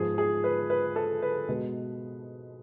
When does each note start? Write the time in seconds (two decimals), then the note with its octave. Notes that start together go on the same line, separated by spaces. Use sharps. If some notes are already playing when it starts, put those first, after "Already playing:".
Already playing: G#2 F3 B3 G#4
0.18 G#4
0.44 B4
0.70 B4
0.96 A4
1.22 B4
1.49 B2 G#3 B3